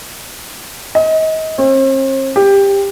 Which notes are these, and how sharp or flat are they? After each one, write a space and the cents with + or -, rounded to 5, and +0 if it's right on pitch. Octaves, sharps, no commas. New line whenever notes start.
D#5 +30
C4 +45
G4 +15